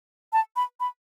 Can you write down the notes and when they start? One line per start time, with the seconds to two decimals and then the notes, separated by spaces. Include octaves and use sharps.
0.33 A5
0.56 B5
0.80 B5